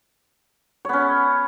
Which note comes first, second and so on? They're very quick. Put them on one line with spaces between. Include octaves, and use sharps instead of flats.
C#5 B3 C#4